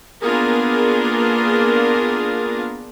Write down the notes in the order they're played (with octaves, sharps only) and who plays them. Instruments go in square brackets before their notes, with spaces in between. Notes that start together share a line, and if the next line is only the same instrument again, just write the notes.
[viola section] A#3 B3 D4 F4 G#4 A#4